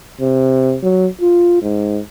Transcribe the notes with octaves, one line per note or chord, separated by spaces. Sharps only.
C3
F#3
F4
G#2